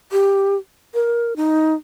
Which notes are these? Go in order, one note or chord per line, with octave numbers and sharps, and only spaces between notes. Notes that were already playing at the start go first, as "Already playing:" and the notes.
G4
A#4
D#4